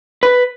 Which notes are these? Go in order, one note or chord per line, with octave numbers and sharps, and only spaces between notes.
B4